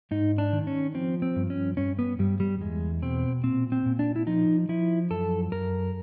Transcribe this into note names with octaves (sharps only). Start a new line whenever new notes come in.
G#2 D#4
D4
D#3
C#4
F3 C4
C4
G2
C#4
G2 C#4
B3
G2 G3
G3
E2 G#3
B2 C4
A#2 C4
C4
A#2
D4
E4
F3 D#4
F3 E4
F#2 A4
F#2 A#4